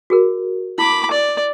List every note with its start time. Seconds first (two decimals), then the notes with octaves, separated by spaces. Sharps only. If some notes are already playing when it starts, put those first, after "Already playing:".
0.10 F#4 G#4 A#4
0.78 E4 B5 D6
1.11 D5